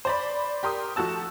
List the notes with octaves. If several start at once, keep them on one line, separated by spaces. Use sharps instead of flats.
C5 D5 B5
G4 A#4 C6 D#6
F3 A3 F#4 A5 E6